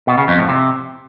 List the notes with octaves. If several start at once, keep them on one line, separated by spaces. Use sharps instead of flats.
B2
C#3
F2
A2
C3